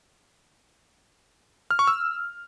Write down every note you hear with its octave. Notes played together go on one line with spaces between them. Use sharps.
F6
C#6
E6